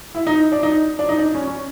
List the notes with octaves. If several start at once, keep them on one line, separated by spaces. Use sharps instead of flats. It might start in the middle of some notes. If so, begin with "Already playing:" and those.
E4
D#4
D4
D#4
D4
D#4
D4
C#4
C#4